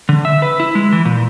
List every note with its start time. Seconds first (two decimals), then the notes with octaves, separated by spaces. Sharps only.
0.09 D3
0.25 E5
0.42 B4
0.60 E4
0.75 G#3
0.92 E3
1.05 A#2